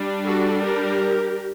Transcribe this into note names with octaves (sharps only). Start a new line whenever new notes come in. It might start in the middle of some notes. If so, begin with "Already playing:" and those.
Already playing: G3 D4
F#4 A4
G4 A#4